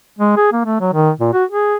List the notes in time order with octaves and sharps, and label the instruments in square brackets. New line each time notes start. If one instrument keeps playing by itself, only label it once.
[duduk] G#3
G#4
A#3
A3
F#3
D#3
A#2
F#4
G#4